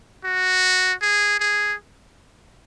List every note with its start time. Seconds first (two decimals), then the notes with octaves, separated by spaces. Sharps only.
0.25 F#4
1.02 G#4
1.40 G#4